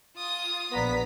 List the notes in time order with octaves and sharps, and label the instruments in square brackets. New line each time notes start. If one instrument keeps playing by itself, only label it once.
[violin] F4 D#6
[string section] A#1 A#5 B6 [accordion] B3 [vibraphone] B4 D5